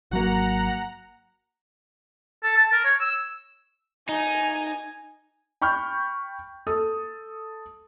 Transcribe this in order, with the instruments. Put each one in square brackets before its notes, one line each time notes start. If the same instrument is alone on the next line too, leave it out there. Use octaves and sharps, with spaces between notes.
[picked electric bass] G#1 F#3 [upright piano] A#3 F#4 [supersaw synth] F#5 A#5
[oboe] A4
A5
A#4
C#5
E6
[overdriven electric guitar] D#4 [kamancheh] G#5
[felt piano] G5 B5 C#6 F6 G6
A4 D#6